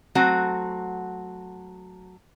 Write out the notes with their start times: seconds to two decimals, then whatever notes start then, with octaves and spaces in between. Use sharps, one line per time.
0.15 F#3 A3 C4 F#4